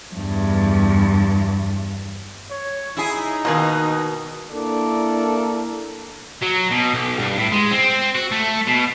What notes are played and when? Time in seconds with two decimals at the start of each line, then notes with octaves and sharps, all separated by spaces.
0.14 E2 G2
2.50 C#5
2.97 D#4 E4 G#4
3.45 B2 D#3 A#3 F4 G#4
4.49 A#3 D4 E4 A4 A#4 D5
6.42 F#3
6.71 B2
6.93 B1
7.19 G2
7.38 A2
7.52 G#3
7.72 C4
8.15 F#4
8.32 A3
8.67 B2